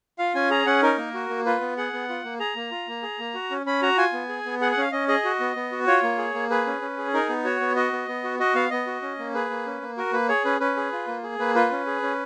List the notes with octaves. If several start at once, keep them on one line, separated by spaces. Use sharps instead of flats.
F4 F5
C#4 G#5
G#4 A#5
C#4 F#5
D#4 A#4
A#3
F#4
A#3
F4 B4
B3
G#4 F#5
B3
F4
A#3
G#4 A#5
A#3
F4
A#3
G#4
A#3
F#4
C#4
C#4 B5
F#4 A#5
F4 G#5
B3
G#4
B3
G#4 F#5
F#5
C#4 F5
C#4 D#5
G#4 D#5
F#4
B3
B3
F#4
F4 C#5
A#3
G#4
A#3
G#4 B4
C#4
C#4
G#4
D#4 A#4
B3
F#4 C#5
B3
F#4 D#5
B3
B3
F#4
F#4 D#5
B3 F5
B3 D#5
F#4
C#4
A#3
G#4 B4
A#3
C#4
A#3
F#4 A#4
A#3 B4
G#4 C#5
C#4 B4
C#4 B4
G#4
F4
A#3
G#4
A#3 B4
F4 B4
C#4
G#4
C#4